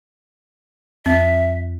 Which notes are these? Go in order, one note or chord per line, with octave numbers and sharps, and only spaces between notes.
F2 C4 E5